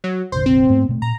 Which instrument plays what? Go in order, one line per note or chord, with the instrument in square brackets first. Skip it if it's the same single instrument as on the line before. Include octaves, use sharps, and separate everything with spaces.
[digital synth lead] F#3
[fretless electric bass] F1 A#1 D3 [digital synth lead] C5
[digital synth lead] C4
[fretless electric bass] G#2 A3 B3
B2 A3
[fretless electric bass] A#2 [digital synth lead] A#5